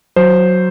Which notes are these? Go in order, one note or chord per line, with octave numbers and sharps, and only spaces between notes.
F#3 C5